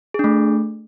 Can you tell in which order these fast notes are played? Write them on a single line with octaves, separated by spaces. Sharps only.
G#4 D4 A3